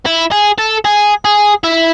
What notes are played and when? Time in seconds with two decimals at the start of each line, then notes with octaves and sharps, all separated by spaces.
0.06 E4
0.31 G#4
0.58 A4
0.85 G#4
1.25 G#4
1.64 E4